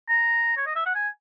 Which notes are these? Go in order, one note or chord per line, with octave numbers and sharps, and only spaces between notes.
A#5
C#5
D#5
E5
F#5
G#5